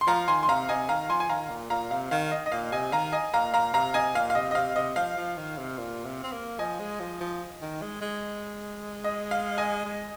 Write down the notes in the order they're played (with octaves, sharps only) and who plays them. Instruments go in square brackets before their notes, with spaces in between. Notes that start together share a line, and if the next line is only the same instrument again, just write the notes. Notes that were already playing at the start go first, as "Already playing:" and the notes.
[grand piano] C6
[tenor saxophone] F3 [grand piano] F5 A#5
[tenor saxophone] D#3 [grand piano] G#5 C6
[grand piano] C6
[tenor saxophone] C3 [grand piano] F5 A#5
[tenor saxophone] C3 [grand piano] D#5 G#5
[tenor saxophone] D#3 [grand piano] F5 A#5
[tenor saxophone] F3 [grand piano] G#5 C6
[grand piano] G#5
[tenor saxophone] D#3 [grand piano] F5 A#5
[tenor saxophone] A#2
[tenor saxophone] A#2 [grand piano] F5 A#5
[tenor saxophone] C3 [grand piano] F5
[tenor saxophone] D#3 [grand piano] F5
[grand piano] D#5
D#5
[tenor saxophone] A#2 [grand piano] F5
[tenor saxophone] C3 [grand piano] D#5 G#5
[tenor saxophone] D#3 [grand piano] F5 A#5
[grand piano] D#5 G#5
[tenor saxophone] A#2 [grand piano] F5 A#5
[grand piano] F5 A#5
[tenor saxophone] C3 [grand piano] F5 A#5
[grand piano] D#5 G#5
[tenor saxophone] A#2 [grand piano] F5
[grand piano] F5
[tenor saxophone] C3 [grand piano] D#5
[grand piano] D#5
[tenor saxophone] C3 [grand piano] F5
[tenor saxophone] C3 [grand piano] D#5
[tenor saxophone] F3 [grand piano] F5
[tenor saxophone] F3
D#3
C3
A#2
C3
C4
A#3
[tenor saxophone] F3 [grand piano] D#5 G#5
[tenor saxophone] G#3
F3
F3
D#3
G#3
G#3
[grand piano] D#5
F5
D#5 G#5
[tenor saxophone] G#3